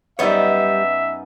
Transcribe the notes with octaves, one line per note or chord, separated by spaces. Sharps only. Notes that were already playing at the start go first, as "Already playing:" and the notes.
F#2 G3 B3 D#4 C#5 E5